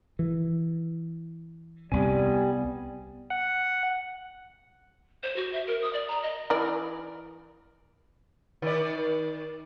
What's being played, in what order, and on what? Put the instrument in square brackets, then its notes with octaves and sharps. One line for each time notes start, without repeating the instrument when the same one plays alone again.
[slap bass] E3
[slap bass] C2 C3 [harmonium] G3 [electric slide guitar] B3 G#5
[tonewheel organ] F#5
[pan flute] C5
F#4
E5
A#4
D#6
D5
A#5
D#5
[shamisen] E3 A#4 D5
[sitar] D#3 D5